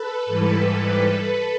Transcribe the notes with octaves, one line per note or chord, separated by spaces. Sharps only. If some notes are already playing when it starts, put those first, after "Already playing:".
Already playing: A4 B4
G#2 E3 G3